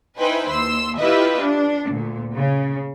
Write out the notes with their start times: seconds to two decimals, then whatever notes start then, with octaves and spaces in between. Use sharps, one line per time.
0.18 D#4 E4 B4 C5 G5 G#5
0.50 D#2 C6 E6
0.98 E4 F4 G4 B4 D#5 E5
1.40 D4
1.92 D2 A#2
2.35 C#3